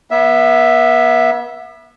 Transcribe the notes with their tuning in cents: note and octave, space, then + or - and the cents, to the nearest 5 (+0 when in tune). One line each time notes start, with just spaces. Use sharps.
B3 -35 E5 +0